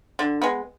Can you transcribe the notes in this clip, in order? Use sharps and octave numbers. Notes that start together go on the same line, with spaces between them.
D3
G#3 B3